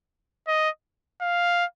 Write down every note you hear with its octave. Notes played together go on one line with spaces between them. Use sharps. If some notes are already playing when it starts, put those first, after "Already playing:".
D#5
F5